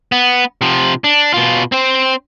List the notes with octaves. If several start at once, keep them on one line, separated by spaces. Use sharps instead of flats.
B3
C3 F3
D4
B2 F4
C4 C5